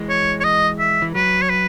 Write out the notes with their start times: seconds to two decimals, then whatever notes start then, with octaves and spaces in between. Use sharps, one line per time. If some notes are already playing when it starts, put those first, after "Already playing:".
Already playing: E3 G#3
0.09 C#5
0.40 C#5
0.44 D#5
0.79 E5
1.02 E3
1.15 F#3 B4
1.42 C#5
1.50 B4